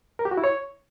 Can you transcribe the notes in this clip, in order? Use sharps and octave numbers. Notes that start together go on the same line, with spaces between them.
A#4
G4
F#4
E4
C#5